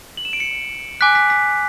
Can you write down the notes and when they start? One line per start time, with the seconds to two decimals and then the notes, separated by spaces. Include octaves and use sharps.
0.17 F#7
0.25 E7
0.33 D7
0.40 C#7
1.01 G#5 D6 F#6 B6
1.15 B6
1.30 B6